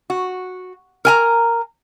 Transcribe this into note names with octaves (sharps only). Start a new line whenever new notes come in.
F#4
A#4 G#5 A#5